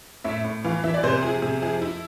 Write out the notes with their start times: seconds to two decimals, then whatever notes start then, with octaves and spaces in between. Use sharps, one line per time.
0.24 A2 E5
0.44 A2
0.64 E3 F5
0.84 E3 E5
0.94 D5
1.03 C3 C5
1.23 F3 G#4
1.42 C3 G#4
1.62 F3 G#4
1.82 E4